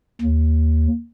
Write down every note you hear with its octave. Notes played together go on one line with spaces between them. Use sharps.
D#2